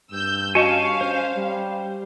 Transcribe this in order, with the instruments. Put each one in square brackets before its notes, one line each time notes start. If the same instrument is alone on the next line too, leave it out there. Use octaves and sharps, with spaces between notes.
[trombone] G2 [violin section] E6 G6
[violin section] C#4 F5 [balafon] F#4 D#5 [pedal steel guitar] G#5 A5 C#6
[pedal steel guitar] C5
[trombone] G3